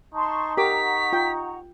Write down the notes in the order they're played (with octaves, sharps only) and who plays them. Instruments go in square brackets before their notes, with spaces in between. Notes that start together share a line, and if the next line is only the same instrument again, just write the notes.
[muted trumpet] D#4 [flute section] A5 C6 C#6
[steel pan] G4 A#4 D6 [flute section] F#5 A#5 C#6 [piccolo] B6
[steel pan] F4 G5